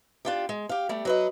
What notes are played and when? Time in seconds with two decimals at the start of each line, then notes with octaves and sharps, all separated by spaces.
0.25 D4 F4 G4
0.49 G#3
0.69 G4 F5
0.89 G3 A3
1.05 F#3 B4 D#5